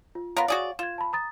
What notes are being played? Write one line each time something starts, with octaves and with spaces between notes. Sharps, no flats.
F4
B3 F4 A#4 C#5 F5
F#4 G#4 D5
F4 G#6 E7
A5 B5
A#5 D#6 A6